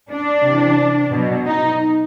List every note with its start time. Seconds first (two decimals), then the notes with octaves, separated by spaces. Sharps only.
0.11 D4
0.44 C3 E3
1.12 B2 F#3
1.45 D#4